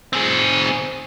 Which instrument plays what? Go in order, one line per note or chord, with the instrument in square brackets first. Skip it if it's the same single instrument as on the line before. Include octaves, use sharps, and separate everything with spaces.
[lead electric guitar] C4 G#4